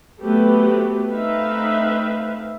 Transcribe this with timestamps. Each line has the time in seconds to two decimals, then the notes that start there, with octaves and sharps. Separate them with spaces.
0.21 F#3 A3 B3 C4 G4 B4
1.10 A3 C4 D#4 B4 E5 F5